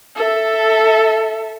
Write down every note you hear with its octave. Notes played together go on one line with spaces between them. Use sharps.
A4 E5